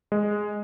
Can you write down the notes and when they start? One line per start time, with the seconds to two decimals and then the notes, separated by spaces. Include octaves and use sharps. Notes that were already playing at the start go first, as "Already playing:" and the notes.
0.12 G#3